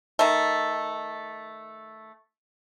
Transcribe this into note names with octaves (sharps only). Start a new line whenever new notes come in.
D#3 A3